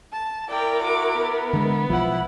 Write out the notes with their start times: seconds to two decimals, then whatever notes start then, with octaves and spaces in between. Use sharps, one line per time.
0.12 A5
0.49 E4 A#4 D5 G5
0.83 F#4 D6
1.18 B3
1.53 D3 G#3
1.90 B1 F3 E4 F#5